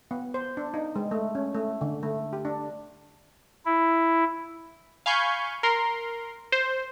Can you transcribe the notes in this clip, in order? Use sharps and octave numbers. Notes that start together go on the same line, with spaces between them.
B3
C5
D4
D#4
G#3
A3
C#4
A3
D3
A3
G4
D4
E4
F5 G#5 B5 C#6 G6
A#4 C6
C5